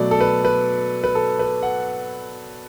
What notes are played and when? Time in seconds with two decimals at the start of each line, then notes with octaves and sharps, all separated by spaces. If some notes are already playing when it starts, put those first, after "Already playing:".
Already playing: B2 F#3 A3 D5
0.11 A4
0.20 B4
0.45 B4
1.04 B4
1.15 A4
1.39 B4
1.63 F#5